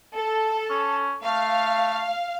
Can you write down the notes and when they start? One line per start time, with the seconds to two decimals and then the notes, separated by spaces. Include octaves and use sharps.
0.16 A4
0.70 C#4
1.24 A3 F5